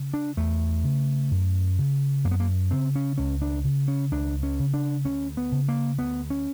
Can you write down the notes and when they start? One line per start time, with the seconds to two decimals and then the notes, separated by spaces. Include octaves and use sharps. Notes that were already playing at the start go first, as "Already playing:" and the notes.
Already playing: C#3
0.14 D4
0.37 E2 A3
0.84 C#3
1.31 F#2
1.78 C#3
2.24 F#2 A#3
2.31 B3
2.40 A#3
2.71 C#3 C4
2.95 C#4
3.18 C#2 C#4
3.42 D4
3.64 C#3
3.88 C#4
4.11 C#2 D4
4.43 C#4
4.59 C#3
4.74 D4
5.05 D2 C#4
5.37 B3
5.52 C#3
5.69 A#3
5.99 D2 B3
6.30 C#4